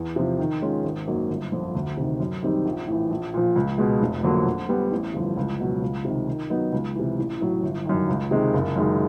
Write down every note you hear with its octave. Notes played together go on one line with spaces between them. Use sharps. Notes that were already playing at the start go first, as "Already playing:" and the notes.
Already playing: E2
C3 F3
D#3
G#3 C#4 F4
G#1
F#2 D#3 F#3 A#3
G1
F2 D3 F3
D2
C3 D#3
F#2
D#3 G3 C4 D#4
A#1
A2 E3
A#1
A#2 F3
C#2
B2 G#3
F1
F2 D3 F#3 A#3
D3
G3 B3
A1
G2 D3 F3
C#2
B2 F#3
C#2
C3 D#3
D#3
F#3 B3 D#4
C#2
C3 E3
A1
A2 F#3
G1
F#2 D#3
C#2
C3 D#3 G#3
F#1
F#2 D#3 G#3